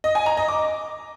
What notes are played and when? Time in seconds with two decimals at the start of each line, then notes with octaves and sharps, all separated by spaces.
0.04 D#5
0.15 G#5
0.26 A#5
0.37 D#5
0.48 D6